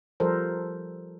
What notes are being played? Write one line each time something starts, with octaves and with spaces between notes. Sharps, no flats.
F3 G3 A4 A#4 C5